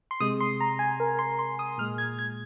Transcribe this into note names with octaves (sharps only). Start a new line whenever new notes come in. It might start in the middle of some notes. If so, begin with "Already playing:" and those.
C6
C3 G#3 D#6
C6
A#5
G#5
A#4
C6
C6
D#6
A#2 G#3 F6
G#6
G#6